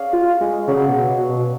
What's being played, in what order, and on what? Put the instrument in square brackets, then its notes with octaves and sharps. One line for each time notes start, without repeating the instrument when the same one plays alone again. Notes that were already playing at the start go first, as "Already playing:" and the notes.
Already playing: [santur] C#4 G#4 D5 F5
[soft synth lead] F4
G#3
[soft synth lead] C#3 [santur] F#3 C#4 G#4 D5
[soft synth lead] B2
B2
B2